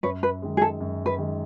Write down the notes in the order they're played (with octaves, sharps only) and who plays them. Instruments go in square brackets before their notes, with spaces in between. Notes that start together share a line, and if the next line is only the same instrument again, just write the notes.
[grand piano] F#2 [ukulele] B4 C#5
[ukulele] B4
[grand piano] D#3 G#3
[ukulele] G#4
A4
[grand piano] F#2
[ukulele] B4
[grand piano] D#3 G#3